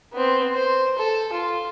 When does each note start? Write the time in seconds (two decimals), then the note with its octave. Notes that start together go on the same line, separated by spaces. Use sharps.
0.13 B3 C4
0.55 C5
0.98 A4
1.33 F4